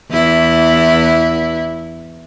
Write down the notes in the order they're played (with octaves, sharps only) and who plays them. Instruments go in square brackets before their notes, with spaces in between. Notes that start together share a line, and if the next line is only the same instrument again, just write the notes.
[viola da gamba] E2 E4